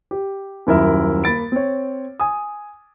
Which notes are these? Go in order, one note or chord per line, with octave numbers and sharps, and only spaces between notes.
G4
D#1 F#2 E4 A#4 E5
A#3 B5 A6 D7
C4 C#5
G#5 D#6